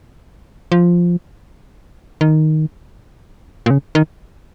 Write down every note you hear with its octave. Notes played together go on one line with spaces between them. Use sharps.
F3
D#3
A#2
C#3
D#3